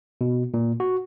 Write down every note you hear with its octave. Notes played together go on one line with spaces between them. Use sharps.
B2
A#2
F#4